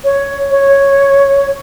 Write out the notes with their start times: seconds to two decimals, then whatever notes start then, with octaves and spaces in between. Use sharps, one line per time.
0.04 C#5
0.51 C#5